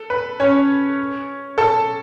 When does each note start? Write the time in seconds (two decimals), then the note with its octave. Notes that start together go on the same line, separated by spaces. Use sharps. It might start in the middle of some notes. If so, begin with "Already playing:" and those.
Already playing: A4
0.10 B4
0.40 C#4 C#5
1.58 A4 A5